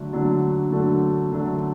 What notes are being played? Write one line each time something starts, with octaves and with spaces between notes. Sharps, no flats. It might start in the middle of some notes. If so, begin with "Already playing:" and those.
Already playing: D3 F#3 A3 D4
D3 F#3 A3 D4
D3 F#3 A3 D4
D3 F#3 A3 D4